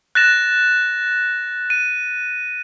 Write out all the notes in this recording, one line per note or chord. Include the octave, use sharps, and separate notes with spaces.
F#6 A6 A#6 E7
D#7